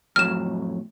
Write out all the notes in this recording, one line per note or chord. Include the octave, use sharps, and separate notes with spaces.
F2 A2 F#3 F6 E7